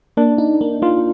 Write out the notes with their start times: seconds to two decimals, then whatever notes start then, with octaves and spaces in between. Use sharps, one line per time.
0.17 A#3 D4
0.38 D#4
0.61 A#3
0.82 A#3 F4